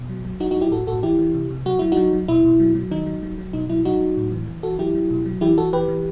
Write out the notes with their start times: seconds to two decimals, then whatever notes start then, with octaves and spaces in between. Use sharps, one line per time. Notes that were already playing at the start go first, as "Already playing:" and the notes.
Already playing: B2
0.09 F#3
0.25 F#3
0.40 F#3 D#4 F#4
0.51 D#4 F#4
0.56 F#3
0.61 E4 G4
0.72 A2 F#4 A4
0.87 A2 F#4 A4
1.03 E3 E4 G4
1.19 E3
1.34 C3
1.50 C3
1.66 F#3 F#4
1.79 F#3 E4
1.92 F#3 D#4 F#4
2.13 F#3
2.28 B2 E4
2.44 B2
2.60 F#3
2.75 F#3
2.91 D#3 D#4
3.06 F#3
3.23 F#3
3.38 F#3
3.53 B2 D#4
3.70 F#3 E4
3.85 F#3 D#4 F#4
4.01 F#3
4.17 A2
4.32 E3
4.48 E3
4.63 E3 F#4 A4
4.79 F#3 E4 G4
4.95 F#3
5.11 B2
5.26 F#3
5.41 E3 E4 G4
5.58 E3 F#4 A4
5.73 E3 G4 B4
5.88 E3